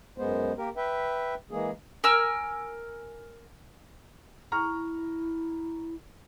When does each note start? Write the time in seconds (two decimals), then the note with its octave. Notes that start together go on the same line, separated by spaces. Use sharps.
0.18 F#2 G#3 B3 C5
0.58 A#3 G4 A#4
0.77 B4 E5 G5
1.51 E3 G#3 A#3 G#4
2.04 A#4 G#5 E6 F6
4.52 E4 A#5 C#6 F6